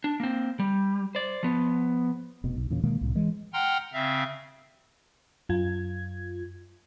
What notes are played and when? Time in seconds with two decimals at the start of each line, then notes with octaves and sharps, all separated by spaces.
0.04 D4
0.20 A#3 C4
0.60 G3
1.15 C5 D5
1.43 F3 B3
2.44 F1 B2
2.56 B1
2.70 E2 A#2 C#3
2.83 B2 D#3 G#3 A#3
3.01 C2 A2
3.15 E3 G#3
3.53 F#5 G5 A#5 C6 F6
3.93 C#3 C4 E5 F5
5.49 F#2 F4 G#6